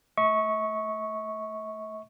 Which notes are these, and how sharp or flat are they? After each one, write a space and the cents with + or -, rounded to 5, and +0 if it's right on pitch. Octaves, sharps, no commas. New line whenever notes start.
A3 +0 E5 -45 C#6 -5